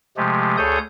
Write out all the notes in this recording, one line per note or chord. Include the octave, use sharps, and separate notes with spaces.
C3 F3 G#3 A3 G4
D2 G#4 A4 C#5 D#6 G6